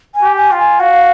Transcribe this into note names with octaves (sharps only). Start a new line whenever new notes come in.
G#5
G4
G#5
F4 G5
G#5
F#4 F5